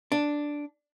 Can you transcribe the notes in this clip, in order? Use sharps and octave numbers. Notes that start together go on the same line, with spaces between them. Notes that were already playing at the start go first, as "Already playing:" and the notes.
D4